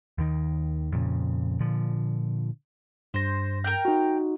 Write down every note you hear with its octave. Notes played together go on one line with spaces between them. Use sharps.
D#2 D#3
F2 A#2 C#3
A#2 D3 F3
G2 C5 A#6
A#4 G5 G6
D#4 F#4